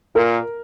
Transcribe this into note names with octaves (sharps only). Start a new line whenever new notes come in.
A#2 A#4